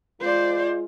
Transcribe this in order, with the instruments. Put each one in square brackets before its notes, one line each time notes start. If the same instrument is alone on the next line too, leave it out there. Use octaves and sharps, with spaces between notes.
[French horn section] G#3 F4 [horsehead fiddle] C5 D5